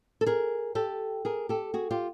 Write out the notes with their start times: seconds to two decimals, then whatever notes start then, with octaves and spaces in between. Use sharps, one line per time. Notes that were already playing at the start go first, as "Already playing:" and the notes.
0.21 A4
0.26 G#4 A#4
0.75 G4 A4
1.25 G#4 A#4
1.49 G4 A4
1.74 F#4 G#4
1.91 F4 G4